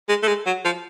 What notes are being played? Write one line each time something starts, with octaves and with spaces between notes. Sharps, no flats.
G#3
A3
G#3
F#3
F3